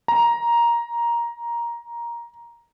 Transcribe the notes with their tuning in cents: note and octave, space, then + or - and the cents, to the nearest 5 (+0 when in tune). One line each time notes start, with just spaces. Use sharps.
A#5 +10